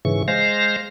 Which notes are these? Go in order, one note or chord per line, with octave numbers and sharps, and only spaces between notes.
G#2 C#3 E3 C#6
G#3 C5 F5 A#6